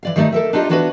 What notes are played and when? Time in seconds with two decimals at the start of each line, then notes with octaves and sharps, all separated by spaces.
0.03 E3 D5 F5
0.16 D#3 G3 A3 D4 D#4
0.33 A4 A#4 E5
0.53 D4 D#4 F4 G4 D#5 A5
0.69 E3 B3 D4 F#4 A#4 B4